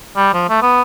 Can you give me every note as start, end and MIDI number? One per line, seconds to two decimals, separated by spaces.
0.16 0.32 55
0.34 0.48 53
0.49 0.58 57
0.62 0.82 59